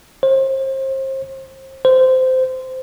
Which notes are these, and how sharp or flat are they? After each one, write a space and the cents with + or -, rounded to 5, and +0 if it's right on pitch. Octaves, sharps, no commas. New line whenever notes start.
C5 +35
C5 -15